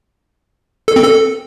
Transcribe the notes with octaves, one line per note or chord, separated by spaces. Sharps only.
A4
C4
A4